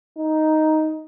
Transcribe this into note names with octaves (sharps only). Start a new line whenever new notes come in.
D#4